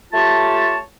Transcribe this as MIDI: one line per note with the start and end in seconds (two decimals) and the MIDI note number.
0.13 0.79 57
0.13 0.79 65
0.13 0.79 67
0.13 0.79 73
0.13 0.79 81